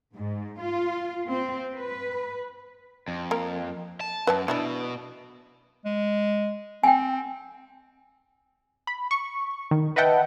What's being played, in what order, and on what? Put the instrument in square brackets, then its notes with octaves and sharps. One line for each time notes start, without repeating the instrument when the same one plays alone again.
[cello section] G#2
F4
C4
B4
[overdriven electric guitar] F2
[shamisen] A#3 A#4
[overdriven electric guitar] A5
[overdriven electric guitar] F#2 [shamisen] B4 E5 A5
[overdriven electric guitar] B2 [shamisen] E3 D4 E4
[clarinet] G#3
[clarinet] C4 [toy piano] G5 G#5
[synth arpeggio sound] B5
C#6
D#3
B4 D#5 E5 F#5 G5 A5